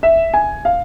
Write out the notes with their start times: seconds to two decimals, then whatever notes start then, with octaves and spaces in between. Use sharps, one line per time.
0.03 E5
0.34 G#5
0.65 F5